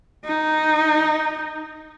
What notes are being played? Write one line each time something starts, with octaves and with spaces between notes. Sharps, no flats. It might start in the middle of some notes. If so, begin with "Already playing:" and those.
D#4